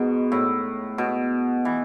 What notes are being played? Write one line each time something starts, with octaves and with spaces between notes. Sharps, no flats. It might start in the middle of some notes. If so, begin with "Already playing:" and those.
Already playing: G#2 B2
A2
B2
E3